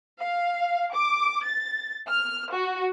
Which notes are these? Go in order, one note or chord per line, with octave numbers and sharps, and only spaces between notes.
F5
D6
A6
F6
F#4